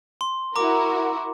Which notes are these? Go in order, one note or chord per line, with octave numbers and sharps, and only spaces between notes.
C6
E4 F#4 A#4 A#5 D6